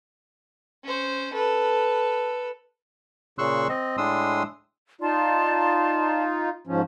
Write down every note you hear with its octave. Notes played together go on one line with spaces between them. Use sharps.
C#4 C5
A4 B4
A#2 C#3 C6 C#6 E6 F#6
C4 D#5
A2 G#3 D4 C6 D#6 E6
D#4 F4 D5 A5 C6
G#2 F3 C#4